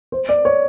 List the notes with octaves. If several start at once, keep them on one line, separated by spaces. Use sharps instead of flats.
C5
D5
C#5